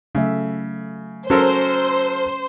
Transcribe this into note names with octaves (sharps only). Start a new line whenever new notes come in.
C#3 F#3 A3 E5
F#3 C#4 A4 A#4 C5